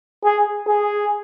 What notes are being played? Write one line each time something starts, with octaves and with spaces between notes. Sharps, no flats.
G#4
G#4